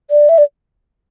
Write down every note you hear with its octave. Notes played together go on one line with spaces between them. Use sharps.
D5
E5
D5